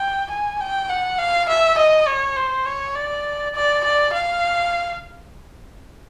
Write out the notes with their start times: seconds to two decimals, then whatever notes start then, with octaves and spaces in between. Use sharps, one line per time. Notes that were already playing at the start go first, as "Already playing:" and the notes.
Already playing: G5
0.31 G#5
0.60 G5
0.90 F#5
1.19 F5
1.49 E5
1.78 D#5
2.07 C#5
2.37 C5
2.66 C#5
2.95 D5
3.55 D5
3.84 D5
4.13 F5